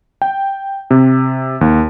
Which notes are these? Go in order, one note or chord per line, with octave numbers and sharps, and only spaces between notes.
G5
C3
D#2